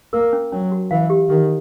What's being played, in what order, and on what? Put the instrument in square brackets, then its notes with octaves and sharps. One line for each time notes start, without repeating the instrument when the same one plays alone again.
[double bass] A#3 [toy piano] A#4
[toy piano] C#4
[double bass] F#3 [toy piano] C#4
[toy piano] F#4
[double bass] E3 [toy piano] F5
[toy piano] G4
[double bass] D#3 [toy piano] G4